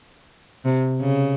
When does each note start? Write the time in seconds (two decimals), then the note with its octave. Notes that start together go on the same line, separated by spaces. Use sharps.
0.65 C3
1.00 C#3